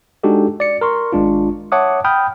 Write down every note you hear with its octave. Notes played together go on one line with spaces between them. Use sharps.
G#3 D4 D#4 F#4 G4 A4
D5 C#7
A#4 C6 C#6
G#1 G#3 D4 F4
C#5 E5 F#5 A5 D6 D#6
G5 B5 D#6 F6 G6